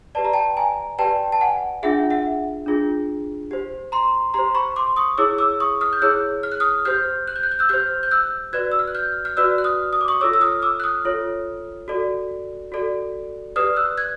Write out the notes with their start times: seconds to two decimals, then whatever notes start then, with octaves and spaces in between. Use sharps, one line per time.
0.15 G4 B4 D5 A5
0.25 A#5
0.33 G5 A5
0.57 G#5 A#5
0.98 G4 B4 D5 G5 A5
1.32 A5
1.41 F#5 G#5
1.83 D4 F4 G#4 E5 F#5
2.10 E5 F#5
2.66 D4 F4 G#4
3.51 G4 C5
3.92 A#5 C6
4.34 G4 C5 A#5 C6
4.55 B5 C#6
4.76 C6 D6
4.96 C#6 D#6
5.17 E4 G#4 C#5 D6 E6
5.38 D6 E6
5.60 C#6 D#6
5.81 D#6 F6
5.93 G6
6.02 E4 G#4 C#5 E6 F#6
6.43 F6
6.52 F#6
6.60 D#6 F6
6.85 G4 C5 F6 G6
7.28 F#6
7.36 G6
7.43 F#6
7.52 G6
7.59 E6 F#6
7.69 G4 C5 F6 G6
8.03 G6
8.11 E6 F#6
8.53 F#4 B4 D5 F#6 G#6
8.72 E6
8.79 F6
8.88 F#6
8.95 F6 G6
9.25 F6
9.37 F#4 B4 D5 E6 F#6
9.58 F#6
9.64 D#6 F6
9.93 D#6
10.01 D6
10.08 C#6 D#6
10.21 F4 A4 C#5 D6 E6
10.33 E6
10.41 D#6 F6
10.62 D6 E6
10.80 F#6
10.84 D#6 F6
11.05 F4 A4 C#5
11.88 F#4 A4 D5
12.72 F#4 A4 D5
13.56 G4 B4 D5 D#6 F6
13.76 E6 F#6
13.97 F#6 G#6